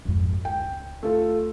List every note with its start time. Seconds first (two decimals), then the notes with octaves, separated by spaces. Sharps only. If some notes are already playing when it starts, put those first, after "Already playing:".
0.05 G#1 F2
0.45 C#2 G5
1.03 A3 F4 A4